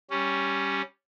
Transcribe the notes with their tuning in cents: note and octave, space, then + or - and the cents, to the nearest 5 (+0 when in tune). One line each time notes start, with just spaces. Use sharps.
G3 -5 C#4 +0